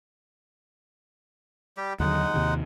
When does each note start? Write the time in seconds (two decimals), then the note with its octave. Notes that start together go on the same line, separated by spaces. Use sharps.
1.77 G3 G4
2.00 D#2 D3 F#3 G#3 D#4 F#5
2.34 D#2 C3 D#3